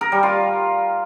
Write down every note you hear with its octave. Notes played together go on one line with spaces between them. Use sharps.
A#4
G3
F4